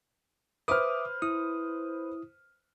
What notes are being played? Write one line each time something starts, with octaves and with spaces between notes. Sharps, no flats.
B4 C5 E5 D6 D#6 F6
E4 D#6